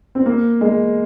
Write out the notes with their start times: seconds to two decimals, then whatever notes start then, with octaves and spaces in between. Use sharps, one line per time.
0.15 C4
0.26 A#3
0.61 G#3